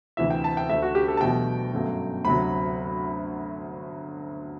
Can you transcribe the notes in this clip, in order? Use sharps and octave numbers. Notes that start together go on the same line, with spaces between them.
D2 C3 E3 E5
G5
A5
G5
D2 D3 A3 E5
F#4
G4
A4
A5
E2 B2 F#3 A3 G5
G1 F#2 F#3 A3
D2 C3 F#3 B5